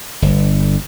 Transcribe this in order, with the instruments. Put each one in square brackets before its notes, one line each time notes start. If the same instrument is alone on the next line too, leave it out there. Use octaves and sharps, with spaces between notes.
[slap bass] G1